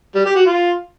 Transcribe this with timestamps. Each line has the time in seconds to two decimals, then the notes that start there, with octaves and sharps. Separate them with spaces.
0.15 G3
0.25 G4
0.35 F#4
0.46 F4